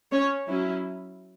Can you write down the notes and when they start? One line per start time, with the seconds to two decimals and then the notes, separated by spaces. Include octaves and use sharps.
0.11 C#4 C#5
0.46 F#3 C#4 E4